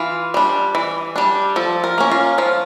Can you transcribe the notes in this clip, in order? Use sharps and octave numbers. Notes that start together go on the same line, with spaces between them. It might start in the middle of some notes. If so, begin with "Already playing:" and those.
Already playing: E3 F4
G3 D4
E3
G3 D4
F3 A4
A#4
A#3 C#4
F4
F3 F4